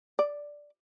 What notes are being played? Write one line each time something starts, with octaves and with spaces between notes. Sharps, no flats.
D5